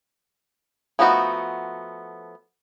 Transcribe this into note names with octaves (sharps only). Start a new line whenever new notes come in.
F3 A3 B3 D#4 F#4